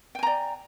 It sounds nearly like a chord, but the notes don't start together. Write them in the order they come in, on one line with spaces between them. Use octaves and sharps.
G5 G#5 A#5 D5